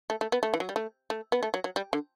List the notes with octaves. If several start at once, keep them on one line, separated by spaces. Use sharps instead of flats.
A3
A3
B3
A3
E3
F#3
G3
A3
A3
B3
A3
F#3
F#3
G3
D3